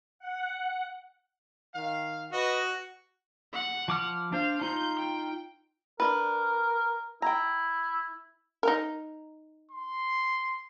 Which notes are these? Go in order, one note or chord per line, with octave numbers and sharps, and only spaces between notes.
F#5
D#3 F5
F#4 B4 D#5
F#5
F3 D6 F6
D4 C5 F5
D#4 F4 G6
G5
D4 A#4 B4
E4 G5 A#5
D#4 A#4
C6